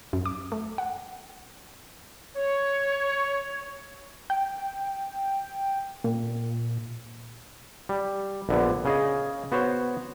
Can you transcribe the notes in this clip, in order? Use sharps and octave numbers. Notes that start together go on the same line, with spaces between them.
F#2
D6
A3
F#5
C#5
G5
A#2
G3
A#1 D3 B3
C#3 G#4 D#5
B3 F#4 C5 C#5